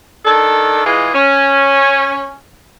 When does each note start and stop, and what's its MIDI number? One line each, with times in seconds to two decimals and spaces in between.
0.25 0.84 51
0.25 0.84 62
0.25 0.84 69
0.86 1.09 52
0.86 1.09 56
0.86 1.09 65
0.86 1.09 68
1.14 2.37 61